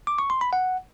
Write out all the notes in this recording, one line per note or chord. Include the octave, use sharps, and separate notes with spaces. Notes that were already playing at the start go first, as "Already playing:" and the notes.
D6
C#6
C6
B5
F#5